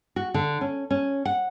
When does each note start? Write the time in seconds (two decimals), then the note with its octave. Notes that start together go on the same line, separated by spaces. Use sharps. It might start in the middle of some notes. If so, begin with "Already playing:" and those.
0.16 F#4
0.34 D3
0.61 C#4
0.91 C#4
1.25 F#5